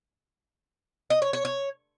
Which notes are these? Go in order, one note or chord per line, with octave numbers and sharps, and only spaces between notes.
D#5
C#5
C#5
C#5